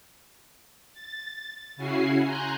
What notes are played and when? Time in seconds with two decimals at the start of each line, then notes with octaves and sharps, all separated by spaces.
0.93 A6
1.76 C#3 C#4 E4 F#4 G#5 C7
2.24 G#5 A#5 C6 F#6 G6